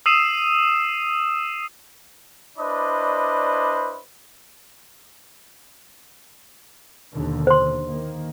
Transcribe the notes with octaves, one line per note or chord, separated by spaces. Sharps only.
D#6 E6 C7 D#7 E7
D4 E4 B4 C5 D5 D#5
D#2 B2 D3
C5 C6
D#3 A#3